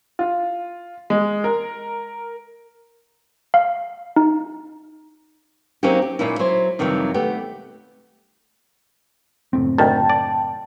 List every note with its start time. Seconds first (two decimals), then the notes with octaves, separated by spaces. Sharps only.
0.19 F4
1.10 G#3
1.44 A#4
3.54 F5
4.16 D#4
5.83 F#3 A#3 C4 C#4 D#4 G4
6.02 G4
6.19 A#2 A#3 C#4 D#4 E4
6.39 F#3 E4 C5
6.79 F2 C3 D#3 E3 F#3 G3
7.14 A3 B3 G4
9.53 F#1 A2 C4
9.78 D2 D#3 G5 A5
10.09 D5